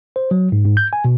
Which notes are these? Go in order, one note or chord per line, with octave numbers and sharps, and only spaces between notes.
C5
F#3
G#2
G#2
G6
G#5
B2